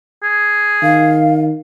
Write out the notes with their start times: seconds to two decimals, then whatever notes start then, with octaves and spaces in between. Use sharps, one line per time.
0.23 G#4
0.83 D#3 F5